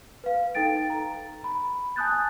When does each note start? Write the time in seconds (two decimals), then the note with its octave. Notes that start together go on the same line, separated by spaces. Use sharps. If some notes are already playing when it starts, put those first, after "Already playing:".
0.24 B4 F5
0.55 D#4 A4 G5 A6 D7
0.90 A#5
1.44 B5
1.96 G#5 A5 D#6 F#6 G6 A6